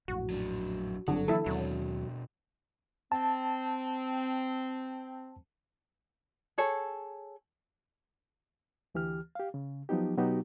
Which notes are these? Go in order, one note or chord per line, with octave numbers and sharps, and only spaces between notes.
A#1 F#2 A2 F#4
F#3 D4
F#1 G2 D3 F#3 C4
E3 F3 A#3 E4 A4
D#2 B2 F#3 G#3 C4 D4
C4 A5
G#4 A4 C#5
D2 E3 G4 F6
G4 F5
C#3
F3 F#3 B3 D#4 G4
B2 F#3 B3 D#4 F#4 G4